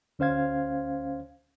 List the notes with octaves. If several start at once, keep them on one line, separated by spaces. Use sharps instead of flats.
D2 C#4 C5 F5 G#6